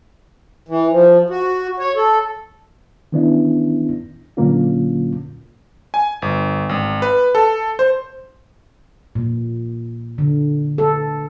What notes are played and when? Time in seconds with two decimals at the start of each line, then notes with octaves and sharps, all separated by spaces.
0.69 E3
0.92 F3
1.30 F#4
1.80 C#5
1.96 A4
3.12 D#3 E3 B3 C#4 D4 E4
4.37 A#2 D3 F#3 A#3 C#4 F4
5.94 G#5
6.22 G1
6.69 G#1
7.02 B4
7.35 A4
7.79 C5
9.15 A#2
10.18 D3
10.78 A4